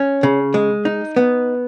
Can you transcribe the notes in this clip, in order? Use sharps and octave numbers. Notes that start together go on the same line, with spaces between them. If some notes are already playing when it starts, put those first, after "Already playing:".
Already playing: C#4
C#3
G#3
D#4
B3